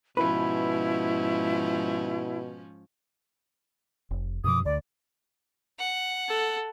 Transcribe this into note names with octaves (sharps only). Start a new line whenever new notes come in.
G#2 B2 F3 C#4 E4 B4
F1
F#2 B2 F3 D6 D#6
D2 D3 D5
F#5
A4